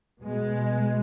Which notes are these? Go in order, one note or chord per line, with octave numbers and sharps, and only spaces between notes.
B2 G#3